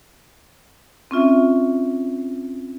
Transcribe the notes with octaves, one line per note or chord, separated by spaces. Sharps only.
C4 C#4 F4 E5